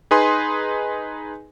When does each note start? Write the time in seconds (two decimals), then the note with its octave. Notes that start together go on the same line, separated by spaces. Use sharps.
0.11 D#4 G#4 B4 G#5 C6